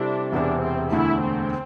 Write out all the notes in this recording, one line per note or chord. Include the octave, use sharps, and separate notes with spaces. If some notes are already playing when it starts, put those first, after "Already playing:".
Already playing: C3 G3 C4 D4 E4 A4
E1 E2 C3 D4
C4
E1 D2 D3 A3 E4
C4